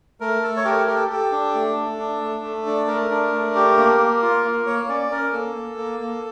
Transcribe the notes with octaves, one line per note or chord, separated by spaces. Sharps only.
A3 A#4
A3 A4
C#5
G4 A#4
G4 A#4
A4
G4 A4
D4
A3
A3
D4
A3
A3
D4
A3 A#4
D4
A3
G4
A#3
A#3
F4
A#3
A#3 C#5
C#4 D5
C#4 A#4
A#3 A4
A#3
A#3
A#3